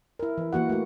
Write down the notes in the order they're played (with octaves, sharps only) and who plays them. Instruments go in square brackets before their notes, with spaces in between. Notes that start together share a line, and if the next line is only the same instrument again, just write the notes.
[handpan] E4 A#4
E3
E3 A#3 F#4 F#5
A3 F#4